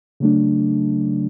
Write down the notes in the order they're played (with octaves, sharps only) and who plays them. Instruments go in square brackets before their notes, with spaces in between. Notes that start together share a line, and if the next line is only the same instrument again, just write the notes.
[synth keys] C#3 F#3 A3 D4